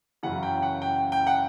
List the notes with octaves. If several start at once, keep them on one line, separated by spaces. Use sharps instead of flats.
F#2 C#3 E3 F#5
G5
F#5
G5
G5
F#5